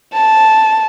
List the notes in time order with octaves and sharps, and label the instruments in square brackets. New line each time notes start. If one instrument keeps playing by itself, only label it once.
[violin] A5